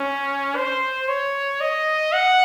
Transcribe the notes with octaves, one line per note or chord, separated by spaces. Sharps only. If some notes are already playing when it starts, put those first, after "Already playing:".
Already playing: C#4
C5
C#5
D#5
F#5